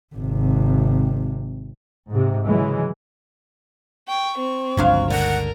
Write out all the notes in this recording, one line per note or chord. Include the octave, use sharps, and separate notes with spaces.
G#1 C3
G#2 C3
C#3 E3 F#3 G#3
G5 C#6
C4
G1 C#2 F3 F#3 D4 F5
D3 A#4 F#5